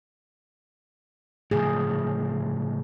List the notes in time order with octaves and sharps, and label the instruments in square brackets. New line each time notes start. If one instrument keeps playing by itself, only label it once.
[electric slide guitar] A2 C#3 F3 [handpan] G#4